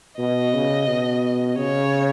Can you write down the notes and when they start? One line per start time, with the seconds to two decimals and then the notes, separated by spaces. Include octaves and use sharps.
0.18 B2 D#5
0.54 C#3
0.88 B2
1.58 C#3 C#5